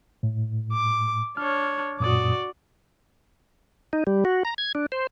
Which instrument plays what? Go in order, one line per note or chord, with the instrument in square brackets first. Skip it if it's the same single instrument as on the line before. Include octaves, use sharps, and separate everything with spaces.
[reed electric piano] A2
[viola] D6
[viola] D4 C#5 [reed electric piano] F6
[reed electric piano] F#2 A#2 D#6 [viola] F#4 D5
[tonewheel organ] D#4
G3
F#4
A#5
G#6
D4
C5